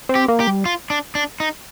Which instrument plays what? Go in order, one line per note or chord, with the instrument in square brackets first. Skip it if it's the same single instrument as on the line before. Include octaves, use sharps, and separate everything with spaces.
[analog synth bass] C4
[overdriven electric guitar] G4
[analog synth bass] A#3
[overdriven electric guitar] G4
[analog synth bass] G3
[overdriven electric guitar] F4
D4
D4
D#4